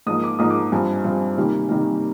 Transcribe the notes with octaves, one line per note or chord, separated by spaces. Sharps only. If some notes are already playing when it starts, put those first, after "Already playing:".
G#2 F3 A#3 D#6
D6
G#2 F3 A#3 D#6
D6
G2 F3 C4 G#5
G2 F3 C4
C3 D#3 G3 A#3
C3 D#3 G3 A#3